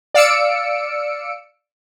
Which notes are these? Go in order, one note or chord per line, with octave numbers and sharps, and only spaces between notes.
D5 F5 E6 C#7 D7